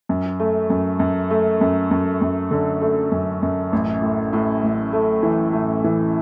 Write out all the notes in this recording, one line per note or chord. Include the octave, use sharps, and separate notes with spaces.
F#2
A3
F#2
F#2
A3
F#2
F#2
F#2
D3
A3
F#2
F#2
A1
A2
A2
A1
A3
E3
A2
E3